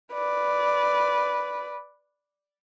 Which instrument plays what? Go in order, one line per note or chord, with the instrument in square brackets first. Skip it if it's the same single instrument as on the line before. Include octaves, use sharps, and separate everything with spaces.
[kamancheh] B4 D5